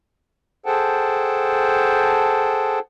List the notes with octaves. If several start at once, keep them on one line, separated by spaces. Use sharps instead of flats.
G#4 A4 C5 F#5 G5 A5